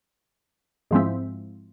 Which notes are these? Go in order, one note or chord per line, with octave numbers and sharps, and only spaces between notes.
G#2 F3 G#3 C4 E4